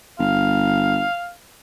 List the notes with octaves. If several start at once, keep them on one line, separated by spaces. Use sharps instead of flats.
G1 F5